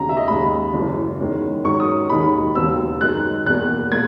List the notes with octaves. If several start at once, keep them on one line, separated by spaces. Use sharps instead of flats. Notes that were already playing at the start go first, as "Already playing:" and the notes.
Already playing: E1 D#2 C#3 A#5
E5
D#5
D#2 C#3 G#3 B5
F#1 F#2 E3 G#3
E2 D#3 G#3 C#4
G#2 D#3 F#3 C#4 C#6
D#6
E1 D#2 D#3 G#3 D#4 B5
E1 D#2 C#3 F#3 B3 E6
F#2 D#3 G#3 F#6
E2 B2 A#3 F#6
A#2 G#3 G#6